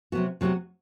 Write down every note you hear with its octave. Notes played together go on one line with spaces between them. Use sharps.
C3 F#3 B3 F#4
C3 F#3 B3 F#4